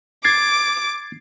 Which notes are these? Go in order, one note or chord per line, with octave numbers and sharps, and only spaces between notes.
D6 G#6 A6 C7